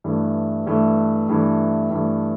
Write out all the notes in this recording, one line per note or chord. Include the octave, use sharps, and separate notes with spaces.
G2 E3 A3
G2 E3 A3
G2 E3 A3
G2 E3 A3